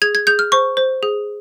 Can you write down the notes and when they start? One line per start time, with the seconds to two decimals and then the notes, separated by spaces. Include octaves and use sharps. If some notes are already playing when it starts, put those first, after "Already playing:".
0.02 G#4 G#6
0.15 G#6
0.27 G#4 G6
0.39 F6
0.52 C5 C#6
0.77 C5
1.03 G#4